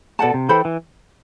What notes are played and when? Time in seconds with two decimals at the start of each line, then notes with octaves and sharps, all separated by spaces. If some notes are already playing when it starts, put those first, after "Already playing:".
0.19 B2 A4 D5 F#5 A5
0.34 C3
0.49 E3 A4 C5 G5 B5
0.65 E3